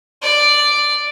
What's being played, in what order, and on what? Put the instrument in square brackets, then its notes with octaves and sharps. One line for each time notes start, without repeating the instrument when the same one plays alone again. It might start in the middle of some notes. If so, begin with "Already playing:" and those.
[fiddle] D5